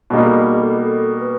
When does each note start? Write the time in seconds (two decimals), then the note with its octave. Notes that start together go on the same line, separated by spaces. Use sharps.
0.10 B2 G3 A#3 D#4 G#4
0.25 A4
0.35 G#4
0.60 A4
0.84 A4
1.20 B4